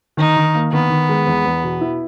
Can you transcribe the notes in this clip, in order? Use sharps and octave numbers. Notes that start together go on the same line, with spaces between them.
D#3 D#4
D#3
A#3
D#3 B3
D#3
G#3
E2
E2
B2
E4